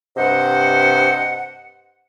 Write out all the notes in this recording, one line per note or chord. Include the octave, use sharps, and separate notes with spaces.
G2 C3 C5 D#5 F#5